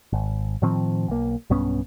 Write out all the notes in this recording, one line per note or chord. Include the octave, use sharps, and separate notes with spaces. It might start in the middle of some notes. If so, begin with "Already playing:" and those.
G#1
A2 D#3 F3 C4
B1 A#3
B1 G2 B3 C#4